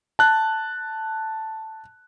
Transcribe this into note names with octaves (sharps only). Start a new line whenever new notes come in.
A5 F#6